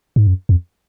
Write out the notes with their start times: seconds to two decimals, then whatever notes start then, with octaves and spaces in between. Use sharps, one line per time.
0.16 G#2
0.27 F#2
0.49 F2